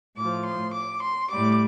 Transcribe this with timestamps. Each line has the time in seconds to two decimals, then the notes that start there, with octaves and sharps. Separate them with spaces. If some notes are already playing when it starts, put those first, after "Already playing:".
0.16 A2 F3 D6
0.45 C6
0.74 D6
1.03 C6
1.31 A2 G3 D6